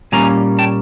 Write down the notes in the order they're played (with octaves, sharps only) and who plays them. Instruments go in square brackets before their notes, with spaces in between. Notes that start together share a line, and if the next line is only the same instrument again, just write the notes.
[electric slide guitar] A#2 G3 A#3 C#4 G#5 A#5
G5 A5